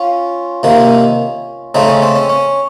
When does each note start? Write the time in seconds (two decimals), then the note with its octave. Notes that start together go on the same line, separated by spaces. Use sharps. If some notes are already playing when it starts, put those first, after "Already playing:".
Already playing: C#4 F4
0.63 C3 D#3 A#3
1.75 C#3 A3 C4 D#4
1.88 C#4
2.02 C4
2.16 C#4
2.29 C#4